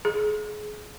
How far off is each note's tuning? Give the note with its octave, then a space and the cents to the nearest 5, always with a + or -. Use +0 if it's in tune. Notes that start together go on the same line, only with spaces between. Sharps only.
G#4 +25